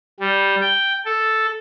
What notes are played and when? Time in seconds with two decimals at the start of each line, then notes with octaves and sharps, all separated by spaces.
0.20 G3
0.61 G5
1.05 A4